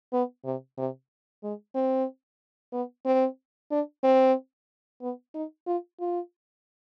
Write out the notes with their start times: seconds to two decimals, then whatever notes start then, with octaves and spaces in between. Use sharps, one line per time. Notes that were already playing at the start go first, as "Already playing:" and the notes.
0.13 B3
0.44 C3
0.78 C3
1.43 G#3
1.75 C4
2.73 B3
3.05 C4
3.71 D4
4.03 C4
5.01 B3
5.34 D#4
5.67 F4
6.00 F4